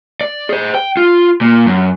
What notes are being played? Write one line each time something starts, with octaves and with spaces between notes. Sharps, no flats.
D5
G#4 C5
G5
F4
A#2
F#2